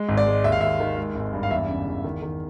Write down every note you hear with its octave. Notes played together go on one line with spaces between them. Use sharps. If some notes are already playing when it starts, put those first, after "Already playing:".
Already playing: G#3
G#1
D5
G#3
D#2 E5
F5
D#2 E5
D#3
G#3
G#1
G2
F5
E2 E5
C#3
E2
D#3
D#3